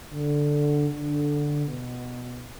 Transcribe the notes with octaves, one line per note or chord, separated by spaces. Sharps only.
D3
D3
B2